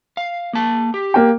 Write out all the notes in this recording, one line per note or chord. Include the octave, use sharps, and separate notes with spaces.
F5
A#3 A5
G4
A#3 G5